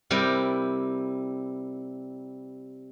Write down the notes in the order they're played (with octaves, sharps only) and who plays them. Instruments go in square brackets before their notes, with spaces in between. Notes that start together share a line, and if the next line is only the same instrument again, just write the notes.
[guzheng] C3 G3 E4 G4 A#4